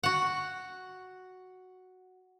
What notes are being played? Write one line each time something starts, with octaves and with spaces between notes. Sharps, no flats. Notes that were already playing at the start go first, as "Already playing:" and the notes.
F#4 F#5